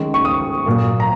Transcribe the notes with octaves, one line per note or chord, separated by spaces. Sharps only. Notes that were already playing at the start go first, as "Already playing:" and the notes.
Already playing: D#3 G#3 C#4
C#6
D#6
A#2 F#3 A#3
A#5